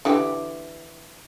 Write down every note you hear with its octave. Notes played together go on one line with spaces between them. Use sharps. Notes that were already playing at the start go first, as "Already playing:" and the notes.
D3 E3 G4